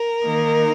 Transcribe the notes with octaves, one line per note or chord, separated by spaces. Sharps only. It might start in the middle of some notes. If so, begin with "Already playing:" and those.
Already playing: A#4
D#3 A#3 D#4